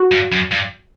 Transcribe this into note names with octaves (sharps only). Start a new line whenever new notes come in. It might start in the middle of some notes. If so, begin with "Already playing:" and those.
Already playing: F#4
G2
F#2
G2